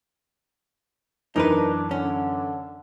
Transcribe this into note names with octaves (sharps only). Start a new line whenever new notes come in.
F#2 E3 D4 D#4 A#4 B4
D3 C#4